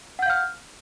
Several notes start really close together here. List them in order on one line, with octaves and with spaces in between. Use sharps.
F#5 G6 F5 F6